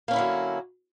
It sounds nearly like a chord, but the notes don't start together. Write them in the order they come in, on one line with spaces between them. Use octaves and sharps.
A#3 C#4 E4 D3 F#3